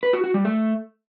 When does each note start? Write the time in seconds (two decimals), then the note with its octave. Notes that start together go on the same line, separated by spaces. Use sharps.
0.03 B4
0.13 F#4
0.24 F#4
0.34 G3
0.45 A3